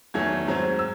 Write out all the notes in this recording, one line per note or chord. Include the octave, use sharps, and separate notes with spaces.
E2 D#3 F#3 A3 G#6
G#2 F#3 C4
E6